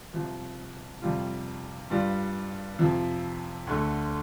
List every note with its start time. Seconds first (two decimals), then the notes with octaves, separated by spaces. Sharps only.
0.13 C2 C3 F3
1.02 F2 C3 G3 F4
1.90 G2 G3 F4
2.79 F2 C3 F3
3.67 D2 D3 A3